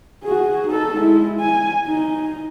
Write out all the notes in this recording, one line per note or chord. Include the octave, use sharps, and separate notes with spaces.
F#4 G#4
D#4 A4
G#3 E4
G#5
D#4